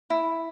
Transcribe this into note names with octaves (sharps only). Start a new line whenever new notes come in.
E4